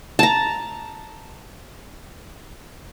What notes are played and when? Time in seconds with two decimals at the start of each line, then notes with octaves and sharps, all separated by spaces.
0.19 A5 A#5